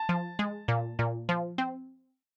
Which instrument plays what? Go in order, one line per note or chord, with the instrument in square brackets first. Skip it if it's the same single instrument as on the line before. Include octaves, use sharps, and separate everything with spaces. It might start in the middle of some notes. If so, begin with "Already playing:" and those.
Already playing: [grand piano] A5
[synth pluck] F3
G#3
A#2
A#2
F3
C4